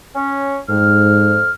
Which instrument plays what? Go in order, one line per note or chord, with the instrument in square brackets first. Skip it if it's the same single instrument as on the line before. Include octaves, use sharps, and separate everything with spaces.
[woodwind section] C#4
[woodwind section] F2 F6 [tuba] G#2